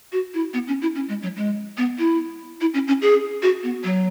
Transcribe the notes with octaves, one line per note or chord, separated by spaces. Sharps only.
F#4
E4
B3
C#4
E4
C#4
G#3
F#3
G#3
B3
E4
E4
C#4
C#4
G#4
F#4
B3
F#3